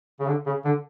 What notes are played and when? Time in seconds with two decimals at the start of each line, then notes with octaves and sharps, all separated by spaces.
0.20 C#3
0.27 D3
0.46 C#3
0.64 D3